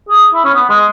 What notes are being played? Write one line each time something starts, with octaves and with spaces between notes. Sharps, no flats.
G#4
E4
C#4
B3
G#3